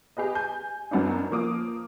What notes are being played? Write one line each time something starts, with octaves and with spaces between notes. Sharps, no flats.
G4 G#4 B4 D#5
G#5 G6
F#2 F#3 B3 D4 D#4
F3 A#3 D6 D#6